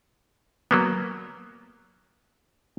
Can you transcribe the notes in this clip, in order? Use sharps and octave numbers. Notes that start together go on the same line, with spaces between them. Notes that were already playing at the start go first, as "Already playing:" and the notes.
F#3 A#3 B3